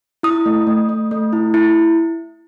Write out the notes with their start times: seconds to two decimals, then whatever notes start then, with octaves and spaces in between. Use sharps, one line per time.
0.23 E4 D#6
0.46 A3
0.67 A3
0.89 A3
1.11 A3
1.33 E4
1.54 E4